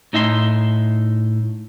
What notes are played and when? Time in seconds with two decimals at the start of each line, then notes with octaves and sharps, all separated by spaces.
0.13 A2 D#4 E5 A#5 C6